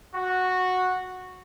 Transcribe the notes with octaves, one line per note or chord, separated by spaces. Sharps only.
F#4